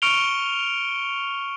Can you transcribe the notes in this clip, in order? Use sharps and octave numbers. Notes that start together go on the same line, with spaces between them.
C#6 F6 C#7 D7 F7 G7